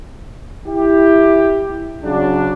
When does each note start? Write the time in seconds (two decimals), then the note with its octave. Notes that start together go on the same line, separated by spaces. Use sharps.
0.66 E4 G4
2.03 C#3 F#3 D4